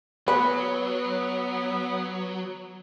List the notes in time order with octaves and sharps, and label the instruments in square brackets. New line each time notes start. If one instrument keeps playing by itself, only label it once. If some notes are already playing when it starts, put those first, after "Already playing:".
[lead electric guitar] F#3 [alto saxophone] B3 [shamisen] B4